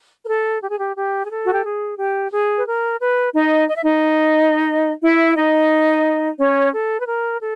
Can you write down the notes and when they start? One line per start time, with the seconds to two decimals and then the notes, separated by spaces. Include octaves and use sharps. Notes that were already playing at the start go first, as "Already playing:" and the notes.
0.24 A#4
0.27 A4
0.62 G4
0.69 G#4
0.78 G4
0.96 G4
1.25 G#4
1.30 A4
1.45 F#4
1.54 G4
1.64 G#4
1.98 G4
2.32 G#4
2.57 B4
2.65 A#4
2.99 B4
3.33 D#4 D#5
3.67 D#5
3.76 E5
3.83 D#4 D#5
5.03 E4 E5
5.36 D#4 D#5
6.38 C#4 C#5
6.72 A4
7.00 B4
7.07 A#4
7.40 A4